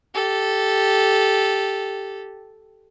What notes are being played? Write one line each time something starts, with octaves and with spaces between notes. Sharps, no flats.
G4 A4